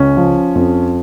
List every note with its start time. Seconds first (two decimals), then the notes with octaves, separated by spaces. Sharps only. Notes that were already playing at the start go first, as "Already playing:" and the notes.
Already playing: C#2 C#4
0.17 F3
0.55 F2